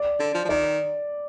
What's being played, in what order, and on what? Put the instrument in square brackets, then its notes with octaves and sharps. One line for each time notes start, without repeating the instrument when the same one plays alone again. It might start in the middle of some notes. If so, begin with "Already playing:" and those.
Already playing: [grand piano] D5
[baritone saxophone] D3
F3
F3
[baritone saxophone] D#3 [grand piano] D5